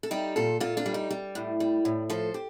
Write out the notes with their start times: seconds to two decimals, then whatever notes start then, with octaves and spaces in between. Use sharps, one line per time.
0.03 A4
0.11 G3 D#4 G4
0.36 A#2 F4 A4
0.60 A#2 F4 A4
0.77 D4 F4
0.86 G3
0.94 D#4 G4
1.11 G3
1.35 A2
1.60 G3
1.85 A2
2.10 F3 A4 C5
2.34 G4